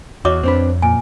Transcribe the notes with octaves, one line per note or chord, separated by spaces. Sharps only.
E2 F#4 C#5 D#5 D6
F2 C4 D4 B4
A#2 G#5